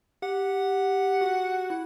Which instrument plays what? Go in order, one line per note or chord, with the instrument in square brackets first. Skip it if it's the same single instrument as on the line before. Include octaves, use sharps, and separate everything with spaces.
[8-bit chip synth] G4 [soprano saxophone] F#5
[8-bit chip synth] F#4
E4